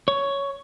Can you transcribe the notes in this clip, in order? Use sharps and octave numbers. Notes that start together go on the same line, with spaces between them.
C#5